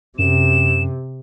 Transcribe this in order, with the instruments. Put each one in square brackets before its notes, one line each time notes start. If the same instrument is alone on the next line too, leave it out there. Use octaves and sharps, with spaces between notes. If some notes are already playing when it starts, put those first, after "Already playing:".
[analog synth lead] F#2 [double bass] C3 [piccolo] E7